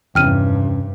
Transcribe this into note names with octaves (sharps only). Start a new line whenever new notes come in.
F1 E2 G2 C3 C#4 G5 F6 D#7